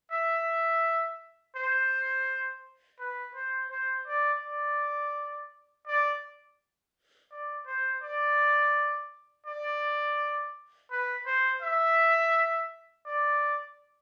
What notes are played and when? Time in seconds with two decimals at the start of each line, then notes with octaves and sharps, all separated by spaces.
0.11 E5
1.56 C5
2.99 B4
3.35 C5
3.71 C5
4.06 D5
4.43 D5
5.87 D5
7.31 D5
7.66 C5
8.02 D5
9.46 D5
10.91 B4
11.26 C5
11.62 E5
13.06 D5